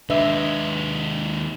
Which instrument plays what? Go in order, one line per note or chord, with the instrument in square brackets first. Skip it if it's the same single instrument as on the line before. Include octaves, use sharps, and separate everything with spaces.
[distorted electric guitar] D#2 G#3 [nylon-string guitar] D4 B4 [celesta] D#5 E5 E6